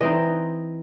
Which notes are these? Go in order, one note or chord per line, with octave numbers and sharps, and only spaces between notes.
E3 C4 D#4 D#5